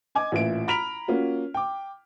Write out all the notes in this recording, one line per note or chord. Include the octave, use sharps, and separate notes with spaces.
D#5 G#5 D6 G#6
A1 A#2 E5 D7
A#5 B5 F6 B6 D7 F7
A#3 C#4 F4 F#4
G5 D6